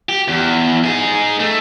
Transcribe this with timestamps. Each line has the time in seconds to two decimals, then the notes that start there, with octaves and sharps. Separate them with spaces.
0.09 G4
0.28 E2
0.84 D#4 G#4
1.40 A3